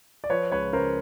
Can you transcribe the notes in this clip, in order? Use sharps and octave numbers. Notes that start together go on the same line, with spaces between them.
D5
F3 B4 C#5
C#2 B4 C#5
C#3 A#4 C5